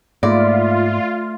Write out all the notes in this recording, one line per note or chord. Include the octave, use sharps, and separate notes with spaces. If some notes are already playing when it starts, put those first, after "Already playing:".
G#2 A3 A#3 F4 D5 E5